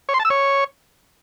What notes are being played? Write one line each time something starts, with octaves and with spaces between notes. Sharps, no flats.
C#5
C6
A5
E6
C#5